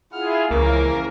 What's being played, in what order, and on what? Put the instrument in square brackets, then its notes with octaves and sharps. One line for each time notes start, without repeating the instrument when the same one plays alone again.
[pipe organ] E4 F4 G#4 [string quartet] F#5 F6
[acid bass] C#2 [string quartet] C#3 E3 F3 [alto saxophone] A#3 [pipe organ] A#4